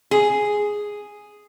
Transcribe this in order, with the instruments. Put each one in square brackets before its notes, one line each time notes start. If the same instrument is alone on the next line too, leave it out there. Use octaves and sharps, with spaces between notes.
[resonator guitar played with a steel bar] G#4